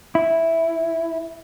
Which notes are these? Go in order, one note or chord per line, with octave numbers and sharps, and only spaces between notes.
E4